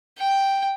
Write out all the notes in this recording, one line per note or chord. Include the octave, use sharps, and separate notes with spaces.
G5